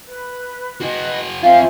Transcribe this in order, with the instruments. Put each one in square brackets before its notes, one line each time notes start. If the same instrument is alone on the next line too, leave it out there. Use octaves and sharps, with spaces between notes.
[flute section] B4
[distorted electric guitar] F#4 G#4 [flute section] B4 D#5
[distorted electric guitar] C4 F4 [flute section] C5 E5 G#5 [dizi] F5